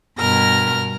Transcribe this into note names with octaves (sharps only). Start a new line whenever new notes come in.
G2 B2 A#4 F6 A#6